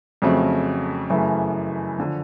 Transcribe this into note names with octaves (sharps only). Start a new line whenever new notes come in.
F2 C#3 F#3 A3 C4
F#2 C#3 E3 A3
D3 F3